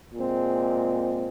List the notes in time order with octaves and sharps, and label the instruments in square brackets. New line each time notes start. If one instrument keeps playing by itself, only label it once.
[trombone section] A#2 G#3 C4